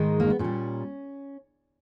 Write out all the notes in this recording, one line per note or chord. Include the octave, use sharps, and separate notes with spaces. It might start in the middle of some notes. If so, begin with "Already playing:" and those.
Already playing: G#2 D#3 G#3 D#4
A#3
B3
A#2 G3 C#4